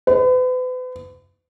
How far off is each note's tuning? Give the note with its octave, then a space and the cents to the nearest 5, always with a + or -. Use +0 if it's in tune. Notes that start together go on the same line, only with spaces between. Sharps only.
B4 +40